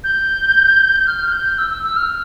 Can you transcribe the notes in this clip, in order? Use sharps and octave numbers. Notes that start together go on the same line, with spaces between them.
G6
F6
G6
E6
E6
E6
F6